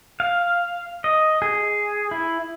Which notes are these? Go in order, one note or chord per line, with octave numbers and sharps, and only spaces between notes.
F5
D#5
G#4
E4